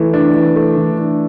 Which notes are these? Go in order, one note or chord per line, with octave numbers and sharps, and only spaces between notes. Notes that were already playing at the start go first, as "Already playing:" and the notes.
Already playing: E3 A3
D4
E3
A3
E3
D4